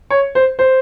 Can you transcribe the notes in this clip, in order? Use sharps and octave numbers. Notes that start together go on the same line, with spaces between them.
C#5
C5
C5